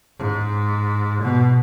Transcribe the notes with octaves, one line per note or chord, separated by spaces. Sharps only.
G#2
B2